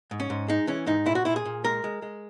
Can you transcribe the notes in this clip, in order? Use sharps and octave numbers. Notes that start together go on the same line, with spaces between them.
G#2
C#4
G#2
G#3 D#4
E3 C#4
G#2 D#4
A#2 E4
F#4
A#2 E4
G#4
A#2
G#3 A#4
G#3
G#3